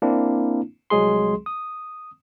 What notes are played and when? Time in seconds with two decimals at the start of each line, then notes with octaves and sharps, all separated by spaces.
0.02 A#3 C4 D4 E4
0.90 C2 F#3 G#3 G#4 C6
1.46 D#6